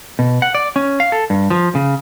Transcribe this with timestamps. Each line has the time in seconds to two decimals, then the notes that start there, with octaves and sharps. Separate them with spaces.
0.19 B2
0.42 F#5
0.55 D5
0.76 C#4
1.00 F5
1.12 A4
1.30 G2
1.50 F3
1.75 C#3